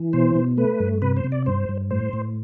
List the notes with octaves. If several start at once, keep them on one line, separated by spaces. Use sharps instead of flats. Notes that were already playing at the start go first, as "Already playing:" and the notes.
Already playing: E3
B2 C5
B2
A3 B4
G2
C3 B4
C5
C3
D5
G2 C5
G2
A2 C5
A2